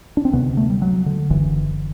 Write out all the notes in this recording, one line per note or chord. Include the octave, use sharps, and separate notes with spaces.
D4
C4
D2 C3 B3
A3
G3
F#3
D3
F#1 F#2 D3 E3